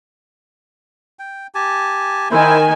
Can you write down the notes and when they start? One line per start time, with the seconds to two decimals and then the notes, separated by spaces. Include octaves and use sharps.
1.19 G5
1.55 G4 G#5 A5
2.31 D#3 E4 C5 G#5